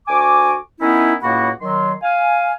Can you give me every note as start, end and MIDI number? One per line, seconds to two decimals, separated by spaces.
0.07 0.53 38
0.07 0.53 66
0.07 0.53 80
0.07 0.53 86
0.80 1.14 51
0.80 1.14 59
0.80 1.14 61
0.80 1.14 63
0.80 1.14 64
1.22 1.49 37
1.22 1.49 45
1.22 1.49 58
1.22 1.49 66
1.22 1.49 78
1.22 1.49 83
1.61 1.92 51
1.61 1.92 54
1.61 1.92 84
2.02 2.52 77
2.02 2.52 80